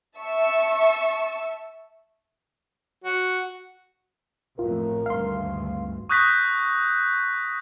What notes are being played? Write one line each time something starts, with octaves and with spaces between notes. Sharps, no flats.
E5 A5 C#6 E6
F#4
A1 F2 A2 F4 A#4
G#1 D2 G2 F5 C6
C#6 D#6 F#6 G6 A#6 B6